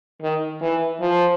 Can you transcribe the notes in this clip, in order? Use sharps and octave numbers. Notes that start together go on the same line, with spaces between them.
D#3
E3
F3